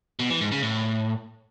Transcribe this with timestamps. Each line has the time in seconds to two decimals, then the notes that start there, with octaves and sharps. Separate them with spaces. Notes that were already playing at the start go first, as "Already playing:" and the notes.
0.19 B2
0.30 E3
0.41 G#2
0.52 C#3
0.63 A2